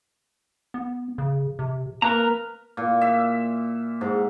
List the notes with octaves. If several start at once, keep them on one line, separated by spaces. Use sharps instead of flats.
B3
C#3
C3
A#3 A#4 B4 A#5
A#2
E5
G#2